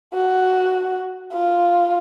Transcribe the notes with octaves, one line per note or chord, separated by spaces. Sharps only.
F#4
F4